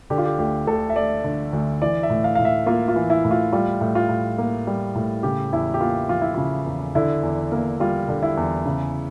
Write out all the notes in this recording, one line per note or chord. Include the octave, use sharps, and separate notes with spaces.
D3 G4
F4
G4
D2 G4
D2 A4
E5
A3 D5
D3
D2
E3 D5
E5
A2
F5
A2 F5
E5
A#3 F4
F4
E3
E4
A2
F4
G3 F4
A2
F4
A2
A#3
G3
A2
C#3 G4
E2 E4
G4
A#3 F4
F3 F4
E4
C#3 F4
E2
D3 E4
E2
A#3
G3 F4
D3
E4
E2
C#3